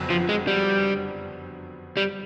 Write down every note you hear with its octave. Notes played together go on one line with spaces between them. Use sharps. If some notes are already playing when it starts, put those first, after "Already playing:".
Already playing: F#1 F2 D3 F#3 B3
F3
G#3
G3
G3